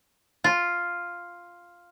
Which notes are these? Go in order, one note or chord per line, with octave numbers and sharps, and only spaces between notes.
F4